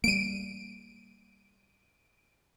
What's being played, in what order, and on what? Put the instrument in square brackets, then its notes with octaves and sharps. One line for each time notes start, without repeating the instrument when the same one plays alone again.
[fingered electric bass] G3 A#3 [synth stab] D7 D#7